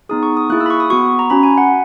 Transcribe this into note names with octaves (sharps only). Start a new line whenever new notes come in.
B3 D#4 G#4 D#6
C#6
D#6
A#3 E4 G#4 F#6
E6
B5
C#6
D#6
B3 F#4 C#6
A#5
C#4 F#4 B5
G#5
F#5